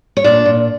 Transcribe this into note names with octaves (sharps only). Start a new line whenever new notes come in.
C#5
A#2 D4 D5
A#2